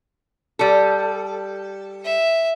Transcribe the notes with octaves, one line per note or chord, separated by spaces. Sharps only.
G3 A4
E5